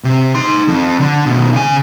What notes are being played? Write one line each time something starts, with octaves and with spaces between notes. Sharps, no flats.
C3
D#4 C6
F2
D3
B2 D#3
C#3 G#5